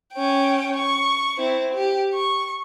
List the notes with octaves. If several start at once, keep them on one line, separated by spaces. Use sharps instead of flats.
C#4 G5
C#6
C4 E4
G4
C#6